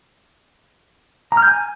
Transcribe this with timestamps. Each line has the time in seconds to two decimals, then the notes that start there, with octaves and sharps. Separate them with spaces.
1.32 A#5
1.37 F6
1.42 G6
1.47 G#5